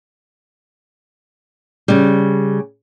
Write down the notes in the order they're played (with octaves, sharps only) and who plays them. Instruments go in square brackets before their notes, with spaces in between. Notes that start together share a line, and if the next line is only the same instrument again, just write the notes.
[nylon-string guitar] C#3 G3